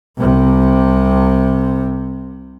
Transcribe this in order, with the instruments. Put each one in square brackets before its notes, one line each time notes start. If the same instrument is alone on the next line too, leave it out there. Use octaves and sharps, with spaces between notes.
[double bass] C2 C3